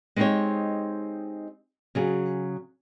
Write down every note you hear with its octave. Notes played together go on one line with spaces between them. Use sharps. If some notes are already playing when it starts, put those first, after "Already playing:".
G#3 C4 D#4 G4 C5 C#5
C#3 F#3 G#4